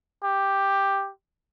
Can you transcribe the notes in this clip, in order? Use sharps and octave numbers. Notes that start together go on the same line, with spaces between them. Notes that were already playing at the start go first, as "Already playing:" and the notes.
G4